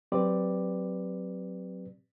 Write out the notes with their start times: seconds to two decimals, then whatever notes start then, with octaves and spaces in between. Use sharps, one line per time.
0.12 F#3 C4 G4 B4 D5